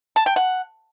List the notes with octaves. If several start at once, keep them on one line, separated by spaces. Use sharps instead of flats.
A5
G5
F#5